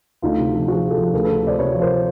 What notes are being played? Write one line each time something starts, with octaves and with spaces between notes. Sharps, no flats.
D2 D#4 F4
C3
F3
F3 F#4 G#4
F3
G4 A4
F3
D2 G#4 A#4
D2 A4 B4
C3 C5 D5
C3 B4 C#5
F3
A#4 C5